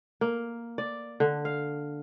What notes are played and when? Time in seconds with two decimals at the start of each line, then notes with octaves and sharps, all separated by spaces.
0.21 A#3
0.78 D5
1.20 D3
1.45 F5